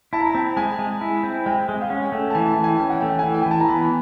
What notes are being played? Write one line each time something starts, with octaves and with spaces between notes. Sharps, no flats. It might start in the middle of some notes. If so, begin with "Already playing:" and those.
E4 A5
A#5
C4 A5
G#3 G#5
G#3
E4
C4
G#3 G5
G#3
F5
C#4 F#5
A3 G5
A5
E3 G#5
A5
E3
G#5
G5
C#4 G5
F#5
A3 G5
G#5
E3 G5
G5
E3 G#5
A5
A#5
B3 B5